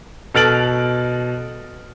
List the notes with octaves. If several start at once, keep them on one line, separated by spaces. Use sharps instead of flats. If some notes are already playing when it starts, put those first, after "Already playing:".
B2 A4 F6 A6 D7 F#7